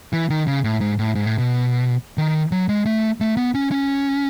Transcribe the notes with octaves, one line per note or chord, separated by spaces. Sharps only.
E3
D#3
C#3
A2
G#2
A2
G#2
A2
B2
D#3
F#3
G#3
A3
A3
B3
C#4
C#4